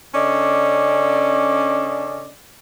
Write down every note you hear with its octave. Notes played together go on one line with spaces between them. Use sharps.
C#3 C#4 D4 A4 D5 D#5